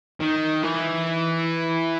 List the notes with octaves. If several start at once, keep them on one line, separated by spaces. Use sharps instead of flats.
D#3
E3